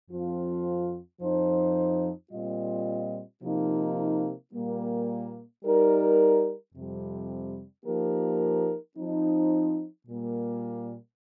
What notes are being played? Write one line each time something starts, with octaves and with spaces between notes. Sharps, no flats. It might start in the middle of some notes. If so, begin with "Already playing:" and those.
F2 F3 C4 F4
F2 F3 D#4 C5
A#2 G3 C4 F4 D#5
C3 F3 A#3 D#4
A#2 G3 A#3
G3 D#4 A#4
F2 C3 G3
F3 A#3 D#4 G4 A#4
F3 C4 D#4
A#2 G3 A#3